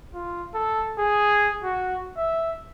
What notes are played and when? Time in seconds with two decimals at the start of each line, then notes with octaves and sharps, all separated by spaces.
0.14 F4
0.54 A4
0.99 G#4
1.63 F#4
2.17 E5